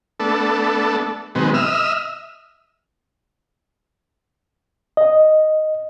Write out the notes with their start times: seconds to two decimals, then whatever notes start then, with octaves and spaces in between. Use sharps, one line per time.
0.20 A3 B3 D4 A4
1.35 B2 D#3 F#3 G#3 B3 C4
1.54 D#5 E5 E6 F6
4.97 D#5